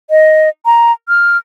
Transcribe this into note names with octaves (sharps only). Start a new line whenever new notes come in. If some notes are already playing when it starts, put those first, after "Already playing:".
D#5
A#5
F6